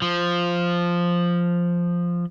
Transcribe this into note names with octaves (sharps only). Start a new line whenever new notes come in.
F3